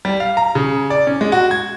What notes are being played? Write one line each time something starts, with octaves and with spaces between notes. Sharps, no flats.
G3
F5
A#5
C#3
D5
C#4
G#3
F#4
G#6